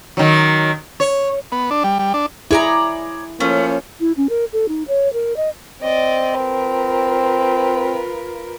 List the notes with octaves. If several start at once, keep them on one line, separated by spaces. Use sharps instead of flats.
D#3 F#3
C#5
B3
D4
G3
G3
D4
E4 G#4 C#5 D5 A#5
F3 A3 A#3 C#4
E4
C#4
A#4
A4
D#4
C#5
A#4
D#5
C4 D5 D#5
F4 A#4 B4